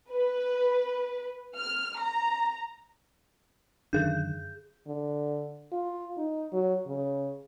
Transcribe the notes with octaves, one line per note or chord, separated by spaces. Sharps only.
B4
F6
A#5
F#2 D3 D#3 G#4 G6
D3
F4
D#4
F#3
C#3